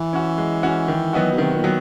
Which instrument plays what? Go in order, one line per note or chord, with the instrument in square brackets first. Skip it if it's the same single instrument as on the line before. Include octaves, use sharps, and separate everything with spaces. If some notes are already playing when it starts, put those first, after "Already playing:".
Already playing: [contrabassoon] E3
[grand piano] C#4 F#4
G#3
C#4 F#4
D#3
F#3 B3 D#4 F#4
[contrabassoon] B2
[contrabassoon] C3 [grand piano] D#3
[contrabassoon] A#2
[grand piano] F#3 B3